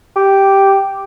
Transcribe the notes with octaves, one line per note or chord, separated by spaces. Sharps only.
G4